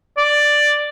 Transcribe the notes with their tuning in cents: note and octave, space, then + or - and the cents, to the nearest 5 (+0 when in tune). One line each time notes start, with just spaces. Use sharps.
D5 +5